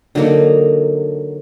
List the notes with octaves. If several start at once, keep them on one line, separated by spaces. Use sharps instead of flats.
D3 F#3 A#3 D#4